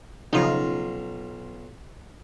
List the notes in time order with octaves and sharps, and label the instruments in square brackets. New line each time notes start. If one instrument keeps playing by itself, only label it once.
[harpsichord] B1 F4 A#5 [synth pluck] C#3 F3 D#4